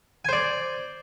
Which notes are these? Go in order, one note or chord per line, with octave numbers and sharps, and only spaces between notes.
C5 D5 G#5